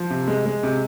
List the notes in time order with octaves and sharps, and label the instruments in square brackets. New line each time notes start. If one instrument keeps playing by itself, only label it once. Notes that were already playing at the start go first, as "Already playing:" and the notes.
Already playing: [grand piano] F3
C3
G#3
G#3
C3